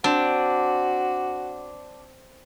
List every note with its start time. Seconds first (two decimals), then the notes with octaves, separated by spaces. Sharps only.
0.04 C4 D4 F#4